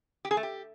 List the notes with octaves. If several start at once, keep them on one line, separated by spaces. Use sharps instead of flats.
G4
G#4
A3
G4